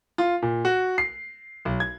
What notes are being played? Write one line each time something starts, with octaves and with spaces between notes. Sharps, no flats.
F4
A#2
F#4
C7
B1
G#6